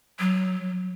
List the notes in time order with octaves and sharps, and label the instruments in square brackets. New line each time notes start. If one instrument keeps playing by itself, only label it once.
[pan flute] F#3